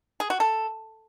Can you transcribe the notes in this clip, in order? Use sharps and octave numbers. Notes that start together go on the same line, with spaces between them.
G#4
F#4
A4